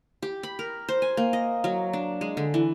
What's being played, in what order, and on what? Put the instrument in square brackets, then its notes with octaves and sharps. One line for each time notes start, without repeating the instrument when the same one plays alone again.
[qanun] G4
B5
A#4
C5
G#5
A#3
D#5
F#3
D4
G#3
D3
E3